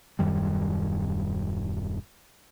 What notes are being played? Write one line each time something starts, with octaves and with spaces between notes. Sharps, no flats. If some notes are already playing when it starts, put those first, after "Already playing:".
D#1 F#2 D#3 G3